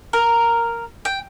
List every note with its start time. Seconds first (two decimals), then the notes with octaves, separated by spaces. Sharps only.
0.13 A#4
1.05 G5